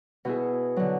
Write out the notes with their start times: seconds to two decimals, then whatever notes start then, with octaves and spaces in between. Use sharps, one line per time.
0.25 B2 B3 E4 G#4
0.76 D3 F#3